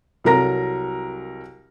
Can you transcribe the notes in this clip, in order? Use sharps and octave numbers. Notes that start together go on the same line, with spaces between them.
C2 F#3 A4 A#4 A#5 A#6